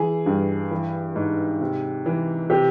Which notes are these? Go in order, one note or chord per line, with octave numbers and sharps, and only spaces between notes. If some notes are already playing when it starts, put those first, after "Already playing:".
Already playing: E3 G#4
G2
E3
G#2
C3
E3
C3 G4